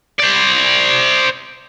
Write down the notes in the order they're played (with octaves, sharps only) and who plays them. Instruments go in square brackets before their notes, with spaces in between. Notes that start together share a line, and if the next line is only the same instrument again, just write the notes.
[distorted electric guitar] C5 D5